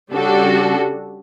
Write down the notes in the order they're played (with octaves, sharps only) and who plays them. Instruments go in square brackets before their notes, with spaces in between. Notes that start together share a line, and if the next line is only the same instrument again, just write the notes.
[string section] C#3 G3 D4 F#4 A4